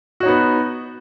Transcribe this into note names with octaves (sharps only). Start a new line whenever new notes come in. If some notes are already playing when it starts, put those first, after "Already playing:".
B3 D#4 F#4 C#5